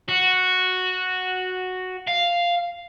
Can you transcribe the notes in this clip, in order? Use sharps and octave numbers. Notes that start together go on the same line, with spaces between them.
F#4
F5